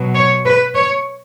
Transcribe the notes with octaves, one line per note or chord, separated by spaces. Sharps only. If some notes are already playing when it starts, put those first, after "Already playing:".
Already playing: B2 F#3
C#5
B4
C#5